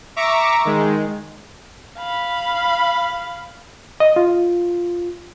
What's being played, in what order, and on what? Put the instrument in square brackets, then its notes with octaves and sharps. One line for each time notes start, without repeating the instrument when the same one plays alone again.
[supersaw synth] E5 A#5 C#6 D6
D#3 G#3
[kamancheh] F5 B5
[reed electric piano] D#5
F4